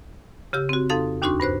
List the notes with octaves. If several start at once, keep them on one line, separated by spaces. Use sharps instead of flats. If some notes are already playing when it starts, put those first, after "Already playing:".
C#3 G4 E6
C4 F#4
F2 D#4 A4 F5 C6
D#2 D4 D#4 F#4 C6 C#6
G2 B4 C5 F#6